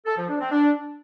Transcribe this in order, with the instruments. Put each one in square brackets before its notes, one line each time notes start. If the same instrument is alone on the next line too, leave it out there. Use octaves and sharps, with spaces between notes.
[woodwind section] A4
F3
D4
C4
D4